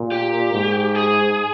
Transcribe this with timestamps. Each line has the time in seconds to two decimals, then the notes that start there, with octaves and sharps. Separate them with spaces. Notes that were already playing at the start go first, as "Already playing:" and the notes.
Already playing: A#2
0.12 G4
0.53 G#2
0.95 G#4